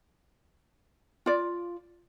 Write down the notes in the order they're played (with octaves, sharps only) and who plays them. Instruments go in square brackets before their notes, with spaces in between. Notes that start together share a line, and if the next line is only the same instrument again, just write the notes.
[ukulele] F4 D5